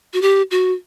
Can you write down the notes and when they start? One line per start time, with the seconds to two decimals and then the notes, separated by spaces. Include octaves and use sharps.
0.13 F#4
0.22 G4
0.51 F#4